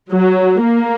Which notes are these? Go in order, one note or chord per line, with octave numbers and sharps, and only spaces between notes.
F#3
A#3